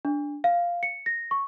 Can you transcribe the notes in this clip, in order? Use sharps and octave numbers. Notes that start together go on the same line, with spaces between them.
D4
F5
C#7
A#6
C#6